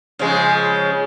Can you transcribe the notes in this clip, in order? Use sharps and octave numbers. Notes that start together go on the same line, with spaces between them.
C#3 F3 G#3